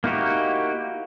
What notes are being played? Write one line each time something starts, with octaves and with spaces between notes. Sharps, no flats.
A#3 D#4 E4 F#4 G4